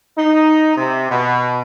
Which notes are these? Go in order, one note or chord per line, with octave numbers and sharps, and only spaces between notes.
D#4
C3
B2